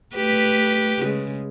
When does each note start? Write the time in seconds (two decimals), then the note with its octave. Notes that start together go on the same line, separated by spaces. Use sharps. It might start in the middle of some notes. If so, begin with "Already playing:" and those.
0.16 A3 G4 B4
1.01 C#3 G#3